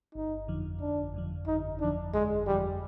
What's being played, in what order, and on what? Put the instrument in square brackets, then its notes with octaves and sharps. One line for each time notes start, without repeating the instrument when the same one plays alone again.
[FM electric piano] G1 [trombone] D#4
[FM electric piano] F2 D3 F3
[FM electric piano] G1 [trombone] D4
[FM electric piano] F2 D3 F3
[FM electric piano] G1 [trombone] D#4
[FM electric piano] F2 D3 F3 [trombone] D4
[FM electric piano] G1 [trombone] G#3
[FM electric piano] F2 D3 F3 [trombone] G3